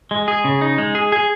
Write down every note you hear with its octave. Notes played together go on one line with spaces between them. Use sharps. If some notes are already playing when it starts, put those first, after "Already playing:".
G#3
G#4
C#3
D#4
G#3
G#4
G#4